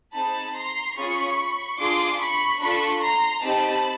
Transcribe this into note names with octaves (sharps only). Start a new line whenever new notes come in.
C4 D#4 G#4 A5 B5
A#5 C6
C#4 F4 G#4 B5 C#6
D4 F4 G#4 C6 D6
B5 C#6
D4 F4 A4 B5 C#6
A#5 C6
C4 D#4 G4 A5 B5